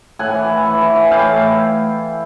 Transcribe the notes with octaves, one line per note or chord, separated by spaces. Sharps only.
A2 F#5 G#5
E3
E3
E3
E3
E3
A2 F5 G5 G#5
A2
A2